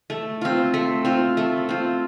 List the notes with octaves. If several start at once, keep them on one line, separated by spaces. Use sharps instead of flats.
A3
C4 F4
A3
C4 F4
A3
C4 F4